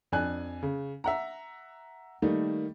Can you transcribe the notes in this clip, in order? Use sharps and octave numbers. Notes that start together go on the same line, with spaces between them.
F2 D4 G#5 F#6
C#3
E5 F#5 A#5
D#3 G3 A3 A#3 D#4